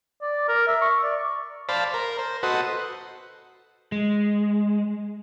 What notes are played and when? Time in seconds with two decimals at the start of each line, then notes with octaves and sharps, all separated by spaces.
0.21 D5
0.48 A#4
0.67 E5
0.81 C#6
1.03 D5
1.69 C5 D5 F5 A5 B5
1.94 A#4
2.19 C5
2.43 F#4 A4 B4 C5 D#5 F#5
3.92 G#3